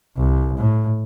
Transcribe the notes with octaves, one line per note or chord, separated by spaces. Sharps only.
C2
A2